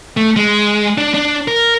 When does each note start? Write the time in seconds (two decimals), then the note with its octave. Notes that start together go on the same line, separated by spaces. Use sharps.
0.17 A3
0.36 G#3
0.98 D4
1.14 D4
1.48 A#4